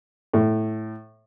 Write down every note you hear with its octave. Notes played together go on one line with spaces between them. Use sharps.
A2